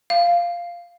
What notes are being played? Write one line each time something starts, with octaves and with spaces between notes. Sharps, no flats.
F5